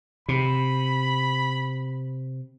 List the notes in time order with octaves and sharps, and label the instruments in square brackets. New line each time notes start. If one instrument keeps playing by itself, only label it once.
[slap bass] C3 [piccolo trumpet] B5